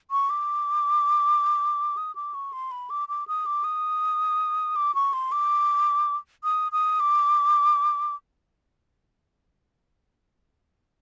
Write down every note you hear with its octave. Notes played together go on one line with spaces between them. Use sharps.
C#6
D6
D#6
D6
C#6
C6
B5
D6
D6
D#6
D6
D#6
D6
C#6
C6
D6
D#6
D#6
D6